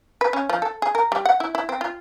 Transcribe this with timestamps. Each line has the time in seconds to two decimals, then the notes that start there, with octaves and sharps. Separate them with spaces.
0.21 B4
0.33 C#4
0.49 F3
0.62 A4
0.82 G#4
0.95 A#4
1.12 G3
1.25 F#5
1.40 E4
1.55 E4
1.69 C4
1.81 F4